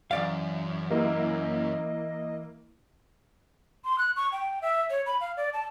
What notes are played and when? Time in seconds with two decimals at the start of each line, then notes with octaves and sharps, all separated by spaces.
0.11 F#2 E3 D5 F5
0.90 A#3 E4 D#5
3.85 C6
3.98 F#6
4.16 C#6
4.32 G5
4.62 E5
4.90 C#5
5.06 B5
5.21 F5
5.37 D5
5.54 A5